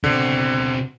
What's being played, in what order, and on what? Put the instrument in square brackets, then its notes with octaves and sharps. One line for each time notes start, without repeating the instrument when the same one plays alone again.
[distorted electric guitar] B2 C4 [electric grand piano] D3